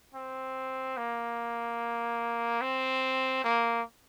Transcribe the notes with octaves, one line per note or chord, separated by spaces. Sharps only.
C4
A#3
C4
A#3